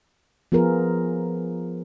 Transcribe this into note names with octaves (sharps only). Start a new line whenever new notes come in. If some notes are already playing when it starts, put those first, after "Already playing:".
F3 B3 F4 G#4 A#4